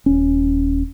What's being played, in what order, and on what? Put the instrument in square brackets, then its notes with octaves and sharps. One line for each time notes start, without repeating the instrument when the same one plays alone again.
[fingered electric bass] D#1 C#4